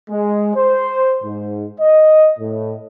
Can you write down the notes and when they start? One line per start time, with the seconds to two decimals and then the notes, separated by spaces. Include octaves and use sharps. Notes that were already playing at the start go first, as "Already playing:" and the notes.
0.10 G#3
0.55 C5
1.23 G#2
1.80 D#5
2.39 A2